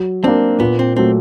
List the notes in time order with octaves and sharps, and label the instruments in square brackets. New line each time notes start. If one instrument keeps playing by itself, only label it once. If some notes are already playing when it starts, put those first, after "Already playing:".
Already playing: [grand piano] F#3
[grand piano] A#3 D4 [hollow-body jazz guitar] C4
[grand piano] A#2 [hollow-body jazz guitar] B3
[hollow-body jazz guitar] C4
[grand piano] F#3 A3 [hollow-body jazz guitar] C4